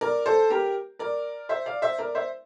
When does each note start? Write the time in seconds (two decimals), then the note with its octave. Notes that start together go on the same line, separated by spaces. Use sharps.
0.01 A#4 D5
0.26 A4 C5
0.50 G4 A#4
0.99 A#4 D5
1.49 C5 E5
1.66 D5 F5
1.82 C5 E5
1.98 A#4 D5
2.15 C5 E5